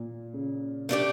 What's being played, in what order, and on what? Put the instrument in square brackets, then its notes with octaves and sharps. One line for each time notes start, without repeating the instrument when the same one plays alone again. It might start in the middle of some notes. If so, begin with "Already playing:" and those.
Already playing: [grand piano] A#2
C#3
[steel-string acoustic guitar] A3 D4 G4 D5